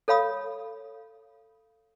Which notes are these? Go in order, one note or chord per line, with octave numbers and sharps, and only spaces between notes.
A4 C#5 F5 B5 D#6